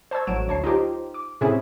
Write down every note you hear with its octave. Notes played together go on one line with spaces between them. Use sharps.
C5 A5 C#6 E6 G#6
A1 F#3 D7 E7
D2 C#5 A5 C7
D#4 F4 G4 C5
D6
A2 C3 C4 C#4 E4 G#4